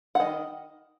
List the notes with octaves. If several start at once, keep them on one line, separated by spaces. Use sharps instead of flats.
F#5
D#3 D#5